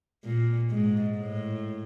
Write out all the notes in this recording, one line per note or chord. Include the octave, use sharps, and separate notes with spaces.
A#2
G#2
A2